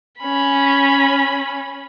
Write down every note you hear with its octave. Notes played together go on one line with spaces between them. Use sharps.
C#4 B5